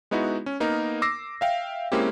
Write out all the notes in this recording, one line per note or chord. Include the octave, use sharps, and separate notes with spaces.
G#3 B3 D#4 E4 F#4
C#4
A#3 B3 D#4 A#4
D6 E6 A#6 C7
E5 F5 G5
G#3 A#3 C4 C#4 E4 G4